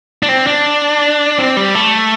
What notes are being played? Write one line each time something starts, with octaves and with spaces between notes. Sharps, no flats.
D4
C4
D4
C4
G3
A3